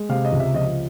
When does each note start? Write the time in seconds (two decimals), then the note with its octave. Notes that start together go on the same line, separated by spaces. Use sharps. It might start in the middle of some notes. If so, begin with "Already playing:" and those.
Already playing: G#3
0.09 C3 F5
0.25 D#5
0.32 C#2
0.39 E5
0.55 F3 D#5